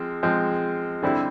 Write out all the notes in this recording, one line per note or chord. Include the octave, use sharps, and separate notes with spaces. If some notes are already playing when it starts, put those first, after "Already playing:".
Already playing: F3 G#3 C4
F3 G#3 C4
D3 G3 C4 E4